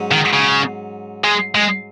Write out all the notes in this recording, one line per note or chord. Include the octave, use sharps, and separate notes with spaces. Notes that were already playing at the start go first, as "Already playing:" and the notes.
Already playing: G#2 F#3 C#4
D#3
C#3
G#3
G#3